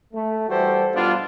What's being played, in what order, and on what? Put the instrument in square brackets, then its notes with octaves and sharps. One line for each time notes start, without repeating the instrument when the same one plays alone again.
[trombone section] A3
E3 G3 F#4 G4 A4 C5
B2 G3 B3 D4 F4